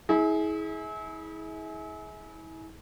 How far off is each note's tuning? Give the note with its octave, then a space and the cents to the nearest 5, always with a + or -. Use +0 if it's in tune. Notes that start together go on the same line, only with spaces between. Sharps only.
E4 -35 G#4 +20